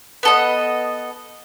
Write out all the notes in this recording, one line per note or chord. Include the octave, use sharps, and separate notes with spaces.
B3 A4 D#5